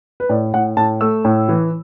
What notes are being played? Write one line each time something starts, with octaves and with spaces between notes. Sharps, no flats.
B4
A2 D5
A2 F#5
A2 A5
A3 E6
A2
E3